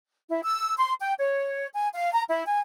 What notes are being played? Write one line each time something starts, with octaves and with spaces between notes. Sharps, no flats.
E4
E6
C6
G5
C#5
G#5
F5
A#5
E4
G#5